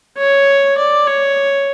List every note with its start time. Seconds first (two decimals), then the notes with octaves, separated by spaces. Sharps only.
0.17 C#5
0.78 D5
1.07 C#5